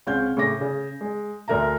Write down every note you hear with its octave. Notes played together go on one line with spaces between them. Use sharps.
C#2 C4 C#4 F5 F#5 G6
A2 C#3 D6 A#6
C#3
G#3
D2 D3 A#4 E5 A#5